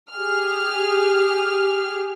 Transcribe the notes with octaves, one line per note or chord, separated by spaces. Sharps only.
G4 G#4 F6